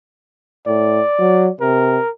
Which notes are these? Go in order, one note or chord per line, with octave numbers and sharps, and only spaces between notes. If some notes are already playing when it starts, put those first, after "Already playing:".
A2 D5
F#3
C3 A#4